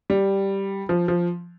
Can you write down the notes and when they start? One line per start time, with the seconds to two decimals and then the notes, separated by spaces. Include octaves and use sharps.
0.10 G3
0.89 F3
1.08 F3